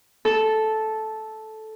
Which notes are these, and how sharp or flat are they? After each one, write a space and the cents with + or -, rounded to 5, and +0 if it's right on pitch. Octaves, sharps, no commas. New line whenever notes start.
A4 -10